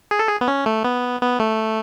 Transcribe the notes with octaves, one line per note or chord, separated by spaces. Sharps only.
G#4
A4
G#4
B3
C#4
A3
B3
B3
A3